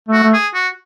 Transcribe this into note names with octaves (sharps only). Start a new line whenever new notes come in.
A3 F#4
A3
G#4
F#4